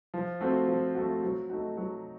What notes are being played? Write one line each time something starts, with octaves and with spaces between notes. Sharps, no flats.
F3
A3 C4 F#4
F3
A3 C4 F#4
F#3
A3 D#4 F#4
F#3